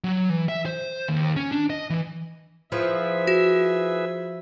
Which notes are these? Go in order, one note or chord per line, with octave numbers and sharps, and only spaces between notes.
F#3
E3
E5
C5
D#2
C#4
D4
D#5
E3
F3 E4 G#4 B4 E5
F#4